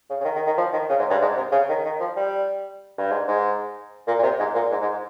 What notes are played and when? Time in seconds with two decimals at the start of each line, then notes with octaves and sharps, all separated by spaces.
0.10 C#3
0.21 C#3
0.25 D#3
0.36 D#3
0.47 D#3
0.58 F3
0.73 D#3
0.89 C#3
0.99 G#2
1.10 G2
1.21 G#2
1.37 C3
1.52 C#3
1.69 D#3
1.85 D#3
2.00 F3
2.16 G3
2.98 G2
3.11 G#2
3.28 G#2
4.07 A#2
4.19 A#2
4.23 C3
4.39 G#2
4.55 A#2
4.71 G#2
4.82 G#2